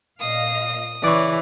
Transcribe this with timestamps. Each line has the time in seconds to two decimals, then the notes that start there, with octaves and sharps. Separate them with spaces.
0.20 A#2 D#5 F5 D#6
1.04 C#3 E3 C#5 D5 C#6